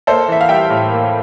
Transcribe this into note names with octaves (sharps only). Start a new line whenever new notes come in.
A#3 A4 C5
E3 E5
F5
G3 E5 G5
A2
A#3